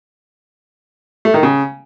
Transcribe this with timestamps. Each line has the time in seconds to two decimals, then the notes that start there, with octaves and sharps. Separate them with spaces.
1.25 A3
1.34 D#3
1.43 C#3